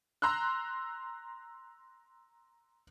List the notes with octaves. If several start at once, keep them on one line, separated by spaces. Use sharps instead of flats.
A#5 C6 E6 F#6